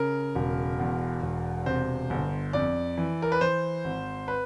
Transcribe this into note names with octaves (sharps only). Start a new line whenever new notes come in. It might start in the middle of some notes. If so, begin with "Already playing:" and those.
Already playing: C#3 A#4
E1
E2
E1
C3 C5
G1
F2 D5
E3
A#4
B4
E3 C5
G#1
B4